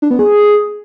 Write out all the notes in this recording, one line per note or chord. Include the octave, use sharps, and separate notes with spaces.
D4
B3
G#4